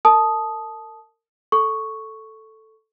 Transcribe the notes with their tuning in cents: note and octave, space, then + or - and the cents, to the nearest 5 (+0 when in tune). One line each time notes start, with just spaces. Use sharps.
A#4 -35 A5 -20 D#6 +0
A4 +0 C#6 +0